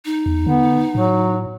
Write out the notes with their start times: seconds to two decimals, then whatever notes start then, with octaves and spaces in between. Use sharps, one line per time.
0.05 D#4
0.26 E2
0.46 D3 B3
0.95 A2 F#3